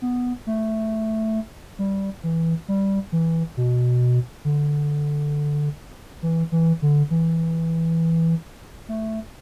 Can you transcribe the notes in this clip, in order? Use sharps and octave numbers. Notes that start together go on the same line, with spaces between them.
B3
A3
G3
E3
G3
E3
B2
D3
E3
E3
D3
E3
A3